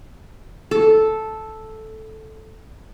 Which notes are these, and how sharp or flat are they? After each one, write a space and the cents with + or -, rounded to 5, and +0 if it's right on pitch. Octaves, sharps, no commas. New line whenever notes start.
A4 -5